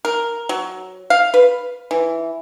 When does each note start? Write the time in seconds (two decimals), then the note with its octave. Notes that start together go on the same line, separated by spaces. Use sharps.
0.05 A#4
0.49 F#3
1.10 F5
1.34 B4
1.91 E3